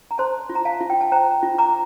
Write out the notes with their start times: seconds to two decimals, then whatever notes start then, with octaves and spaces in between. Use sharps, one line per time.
0.11 A#5
0.18 C5 A5 C6
0.50 F4
0.55 A#5
0.65 F5 A5
0.81 F4
0.90 G5
1.01 A5
1.12 C5 G5 A#5
1.43 F4
1.58 A#5 D6